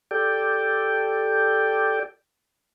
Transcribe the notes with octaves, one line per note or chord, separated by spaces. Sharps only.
G4 A4 D5 G5